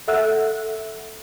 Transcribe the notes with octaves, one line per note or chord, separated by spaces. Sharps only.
A4 E5 F#5 E6 F#6